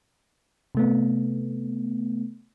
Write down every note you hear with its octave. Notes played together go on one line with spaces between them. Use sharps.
C3 A3 B3